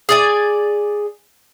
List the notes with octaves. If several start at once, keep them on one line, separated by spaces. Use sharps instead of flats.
G#4 D5 G#5